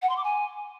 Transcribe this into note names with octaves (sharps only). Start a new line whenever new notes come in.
F#5
C6
D6
G#5